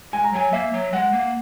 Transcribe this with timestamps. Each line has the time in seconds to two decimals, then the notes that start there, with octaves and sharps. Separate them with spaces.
0.12 G#3 G#5
0.24 A#5
0.33 F#3 G#5
0.52 A#3 E5
0.73 F#3
0.93 G#3 F#5
1.13 A#3